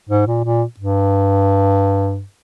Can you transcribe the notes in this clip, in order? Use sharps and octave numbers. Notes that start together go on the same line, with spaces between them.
G#2
A#2
A#2
G2